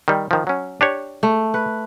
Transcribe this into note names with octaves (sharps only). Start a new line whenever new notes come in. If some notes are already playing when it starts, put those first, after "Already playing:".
D#3 G3
D#3 F3
F#3 C#4
D4 G4 C#5
A3
B4